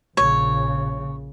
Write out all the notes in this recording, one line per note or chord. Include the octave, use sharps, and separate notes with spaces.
A#1 C#3 C#5